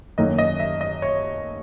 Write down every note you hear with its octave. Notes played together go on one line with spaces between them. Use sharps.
F#2 D#3 A#3 D#5
D#5
E5
D#5
C#5